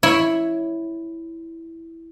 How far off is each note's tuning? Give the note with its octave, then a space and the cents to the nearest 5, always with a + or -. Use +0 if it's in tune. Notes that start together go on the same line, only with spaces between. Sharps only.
E4 +0 C#5 +0